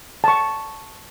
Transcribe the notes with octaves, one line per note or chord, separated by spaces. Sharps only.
A5 C#6